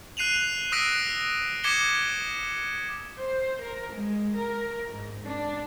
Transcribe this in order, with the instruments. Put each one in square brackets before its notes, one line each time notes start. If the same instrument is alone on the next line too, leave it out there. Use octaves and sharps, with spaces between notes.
[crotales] F#6 C7 D#7 F7 F#7
D#6 E6 F#6 A#6 B6 D7
D6 G#6 B6 C#7 E7 G7
[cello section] C5
A#4
G#3
A#4
G#2
D4